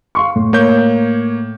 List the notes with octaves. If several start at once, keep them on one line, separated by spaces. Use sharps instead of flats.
F5 C6 C#6
A2
A#3 C#5 G6